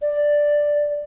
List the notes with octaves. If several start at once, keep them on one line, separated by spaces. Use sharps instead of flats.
D5